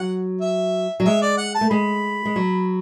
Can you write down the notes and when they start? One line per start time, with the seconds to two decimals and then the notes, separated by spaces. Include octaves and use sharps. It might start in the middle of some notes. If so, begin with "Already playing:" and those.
Already playing: F#3 F#5
0.41 E5
1.00 F#3
1.05 G#3 E5
1.22 D5
1.38 F#5
1.55 A5
1.61 A3
1.70 G#3 B5
2.25 G#3
2.36 F#3